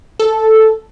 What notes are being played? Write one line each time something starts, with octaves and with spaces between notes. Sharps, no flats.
A4